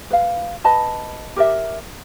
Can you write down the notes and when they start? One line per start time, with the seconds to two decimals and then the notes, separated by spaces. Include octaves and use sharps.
0.10 B4 F5
0.64 B4 D#5 A5 B5
1.36 G4 A#4 D5 E5